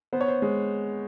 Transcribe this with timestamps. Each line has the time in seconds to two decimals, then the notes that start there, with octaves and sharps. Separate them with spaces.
0.13 B3 C5
0.21 C#5
0.28 C5
0.42 G#3